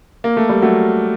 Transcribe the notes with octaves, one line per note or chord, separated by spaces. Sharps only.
A#3
A3
G3
F#3 A3